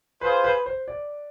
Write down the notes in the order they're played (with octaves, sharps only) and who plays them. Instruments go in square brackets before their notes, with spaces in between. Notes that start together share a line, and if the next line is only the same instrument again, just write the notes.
[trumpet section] F4 G#4 C5 [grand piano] B4
[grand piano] B4
C5
D5